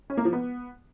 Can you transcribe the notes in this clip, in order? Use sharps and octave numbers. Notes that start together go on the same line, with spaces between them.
C#4
A#3
F3
B3